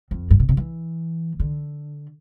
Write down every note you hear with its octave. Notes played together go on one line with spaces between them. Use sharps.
F2
G2
B2
C3
E3
D3